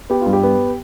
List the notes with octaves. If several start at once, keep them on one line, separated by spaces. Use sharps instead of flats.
B3 G4
G2 F4
G4
B3